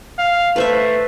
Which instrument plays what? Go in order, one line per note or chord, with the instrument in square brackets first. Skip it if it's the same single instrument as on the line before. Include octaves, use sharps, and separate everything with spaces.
[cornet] F5
[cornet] A3 [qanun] B4 C5 E5